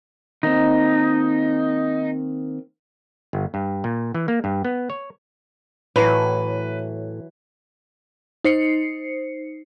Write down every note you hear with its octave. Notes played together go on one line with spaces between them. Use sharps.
D#3 A#3 C4 D#4
G1
G2
A#2
E3
A#3
G2
B3
C#5
A2 E3 F#3 B4
D#4 C5 C7 C#7